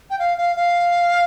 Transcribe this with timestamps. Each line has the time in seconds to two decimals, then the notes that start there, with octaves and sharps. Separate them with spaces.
0.10 G5
0.19 F5
0.38 F5
0.56 F5